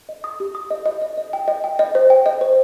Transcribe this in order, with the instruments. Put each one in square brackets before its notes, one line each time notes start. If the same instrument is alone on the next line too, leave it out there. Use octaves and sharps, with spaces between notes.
[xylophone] D#5
D#6
G4
D#6
D#5
D#5
D#5
D#5
G5
D#5
G5
D#5
C5
G5
D#5
C5